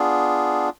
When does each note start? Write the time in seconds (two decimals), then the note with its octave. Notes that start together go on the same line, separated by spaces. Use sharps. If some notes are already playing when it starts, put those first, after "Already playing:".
Already playing: B3 D4 F4 G#4